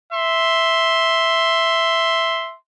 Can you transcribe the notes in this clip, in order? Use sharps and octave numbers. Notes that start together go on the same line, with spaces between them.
E5 C6